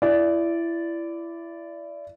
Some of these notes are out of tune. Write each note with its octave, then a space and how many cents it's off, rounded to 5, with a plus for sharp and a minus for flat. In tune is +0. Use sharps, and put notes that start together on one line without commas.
E4 +25 D5 -10